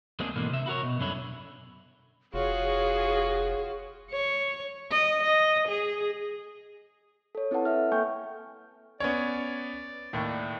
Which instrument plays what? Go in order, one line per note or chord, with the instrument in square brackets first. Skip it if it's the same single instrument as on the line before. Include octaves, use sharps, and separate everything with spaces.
[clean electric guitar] D2 G#3 A#3 C4 D4 G#4
G#2 B2 D3 E3 A#3
C3 E5
E4 F#4 A#4 C#5
B2
C2 F#2 D3 C#4 E4
[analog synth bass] F1 [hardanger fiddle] F4 F#4 [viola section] G#4 [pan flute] C#5
[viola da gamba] C#5
D#5
D#5
G#4
[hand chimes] A4 C#5
C4 E4 A4 B4 F#5 A5
A4 E5 F6
A#3 A4 G5 G#5 C#6 G6
[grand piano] B3 C#4 C#5 [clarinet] D5
[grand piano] D#2 A2